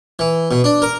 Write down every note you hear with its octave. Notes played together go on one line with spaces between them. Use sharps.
E3
B2
D4
A#4